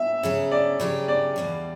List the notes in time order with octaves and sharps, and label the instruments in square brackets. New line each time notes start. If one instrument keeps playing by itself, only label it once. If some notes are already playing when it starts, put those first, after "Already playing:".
Already playing: [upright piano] E5
[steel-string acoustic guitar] C#3 F#3 C#4
[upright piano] D5
[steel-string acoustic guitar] C#3 F#3 C#4 G4
[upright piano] D5
[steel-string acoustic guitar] E2 B2 G3